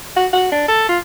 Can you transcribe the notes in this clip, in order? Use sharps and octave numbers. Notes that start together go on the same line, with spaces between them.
F#4
F#4
D4
A4
F4